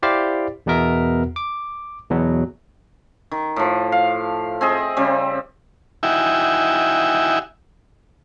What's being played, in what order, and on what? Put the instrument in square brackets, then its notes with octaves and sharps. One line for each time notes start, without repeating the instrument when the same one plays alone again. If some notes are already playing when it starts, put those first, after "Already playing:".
[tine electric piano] E4 G4 C5 D5 F5
E2 B2 B3 A#4 E5
D6
E2 B2 F#3
[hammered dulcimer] D#3
A2 F3
F5
C4 G#4 D#5 E5
C#3 G3 C4
[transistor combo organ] D#4 E4 F#4 E5 G5 G#5